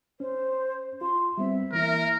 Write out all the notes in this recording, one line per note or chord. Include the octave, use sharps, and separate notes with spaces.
C#4 C5
F4 C6
G3 B3 C4 E5
E3 A#3 E4 A#4